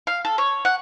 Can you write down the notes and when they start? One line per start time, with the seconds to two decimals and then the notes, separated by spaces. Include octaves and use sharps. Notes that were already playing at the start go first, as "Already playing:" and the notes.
0.07 F5
0.25 A4
0.38 C#5
0.65 F#5